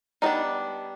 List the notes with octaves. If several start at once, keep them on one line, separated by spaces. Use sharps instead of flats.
G3 B3 D4 D#4 D#5